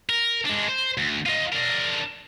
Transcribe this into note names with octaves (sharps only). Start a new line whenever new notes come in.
A#4
G#3 D4
C5
D2
D#4 F4
D4 A#4